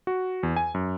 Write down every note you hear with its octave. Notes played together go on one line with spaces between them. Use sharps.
F#4
E2
G#5
F#2